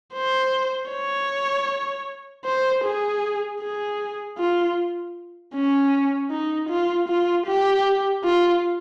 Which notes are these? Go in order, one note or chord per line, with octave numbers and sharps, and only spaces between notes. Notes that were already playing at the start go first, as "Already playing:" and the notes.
C5
C#5
C5
G#4
G#4
F4
C#4
D#4
F4
F4
G4
F4